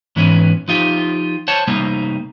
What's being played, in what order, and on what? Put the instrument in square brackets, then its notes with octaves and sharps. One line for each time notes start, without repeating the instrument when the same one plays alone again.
[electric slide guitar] G#2 E3 B3 C#4
F3 D#4 F4 G4
C5 C#5 F#5 A5
C3 G3 A#3 D#4